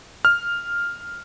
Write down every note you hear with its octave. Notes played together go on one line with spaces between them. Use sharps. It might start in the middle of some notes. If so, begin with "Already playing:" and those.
F6